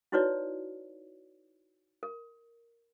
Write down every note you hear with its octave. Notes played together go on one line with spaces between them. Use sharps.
D#4 E4 F#4 B4 C#5 D5
A#4